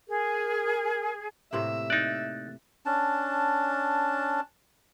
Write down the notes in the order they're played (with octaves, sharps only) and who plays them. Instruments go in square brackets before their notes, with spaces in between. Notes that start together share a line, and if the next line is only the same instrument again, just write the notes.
[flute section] G#4 [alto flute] A#4
[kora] A2 C3 A#3 [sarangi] E5
[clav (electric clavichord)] D#4 D5 [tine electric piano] F#6 A6
[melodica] C#4 D4 A5